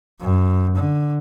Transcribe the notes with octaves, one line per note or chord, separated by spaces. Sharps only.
F#2
D3